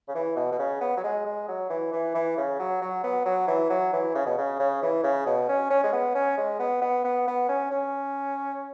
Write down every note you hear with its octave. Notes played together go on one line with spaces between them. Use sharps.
C#3
E3
B2
B2
C#3
B3
F#3
G#3
G#3
F#3
E3
E3
E3
C#3
F#3
F#3
B3
F#3
E3
F#3
E3
C#3
B2
C#3
C#3
E3
C#3
B2
C#4
C#4
G#3
B3
C#4
G#3
B3
B3
B3
B3
C#4
C#4